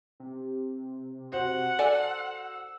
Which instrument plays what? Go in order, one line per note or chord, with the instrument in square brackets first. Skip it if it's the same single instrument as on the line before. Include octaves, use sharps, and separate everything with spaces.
[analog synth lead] C3
[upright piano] F#4 C5 [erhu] F#5
[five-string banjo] A4 D5 G#5 [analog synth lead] E6